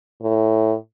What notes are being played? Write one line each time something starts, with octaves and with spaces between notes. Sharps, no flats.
A2